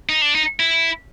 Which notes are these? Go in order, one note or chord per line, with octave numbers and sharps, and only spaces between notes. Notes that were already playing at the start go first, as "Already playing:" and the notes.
D#4
D4
D#4
E4